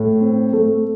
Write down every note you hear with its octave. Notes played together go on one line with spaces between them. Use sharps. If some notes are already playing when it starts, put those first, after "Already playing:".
Already playing: A2
C4
A3